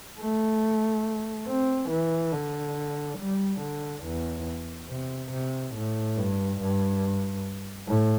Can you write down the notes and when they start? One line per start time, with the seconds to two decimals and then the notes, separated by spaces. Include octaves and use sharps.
0.19 A3
1.48 C4
1.90 E3
2.32 D3
3.19 G3
3.61 D3
4.04 E2
4.89 C3
5.32 C3
5.75 A2
6.17 G2
6.61 G2
7.88 A2